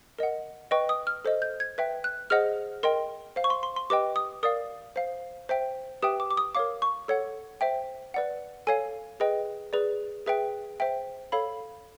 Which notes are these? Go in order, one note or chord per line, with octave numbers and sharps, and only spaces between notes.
A#4 D#5 F#5
B4 D#5 G5 C#6
D#6
F6
A4 C5 D#5
G6
G#6
B4 E5 G5
F#6
G#4 C5 D#5 F#5 F6
A#4 D#5 G5 C6
C5 F5
C#6
C6
C6
C6
G4 B4 D#5 G5 D6
D#6
A#4 D5 F5 D#6
C5 F5
C5 E5 G5
G4 B4 E5 G5 D#6
D6
D6
D#6
A#4 C#5 F5 D6
C#6
A4 C#5 F#5
C5 E5 G5
B4 D5 F#5
A4 C#5 F5 G#5
G#4 B4 D#5 G5
G#4 B4 D5
G#4 B4 E5 G5
C5 E5 G5
A4 C#5 F5 B5